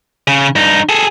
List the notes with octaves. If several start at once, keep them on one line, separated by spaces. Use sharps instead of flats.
C#3
G2 D#4
G#4 A4